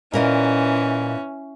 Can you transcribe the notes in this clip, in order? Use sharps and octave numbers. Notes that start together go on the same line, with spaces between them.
A#2 E3 C#4 A#4 D#5